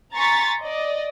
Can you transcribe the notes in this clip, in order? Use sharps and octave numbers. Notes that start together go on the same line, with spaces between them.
G#5 A#5 C6 C#6 A6 B6
D5 D#5